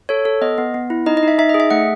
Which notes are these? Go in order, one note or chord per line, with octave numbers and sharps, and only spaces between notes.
A4 C#5
A4
B3 D#5
B3
B3
E4
D#4 D#5
D#5
D#4 E5
D#4 E5
D#5
G#4
E5
A3 F#5